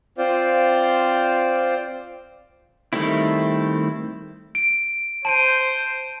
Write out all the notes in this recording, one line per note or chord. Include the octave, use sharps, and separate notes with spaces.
C4 F4 C5 D5
D#3 G3 A3 C4 E4
D7
C5 A5 D7 D#7